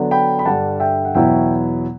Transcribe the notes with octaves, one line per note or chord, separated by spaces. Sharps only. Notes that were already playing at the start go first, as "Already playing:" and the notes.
Already playing: D3 F#3 B3 D4
G5 B5
B5
G2 D3 G3 F#5 A5
E5 G5
F#5
E2 B2 F#3 B3 E4 E5 G5